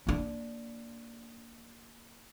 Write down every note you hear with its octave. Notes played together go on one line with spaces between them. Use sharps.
A#3 D4